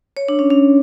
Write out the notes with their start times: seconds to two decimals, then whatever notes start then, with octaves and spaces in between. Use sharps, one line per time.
0.17 C#5
0.28 D4
0.39 C#4
0.50 C#4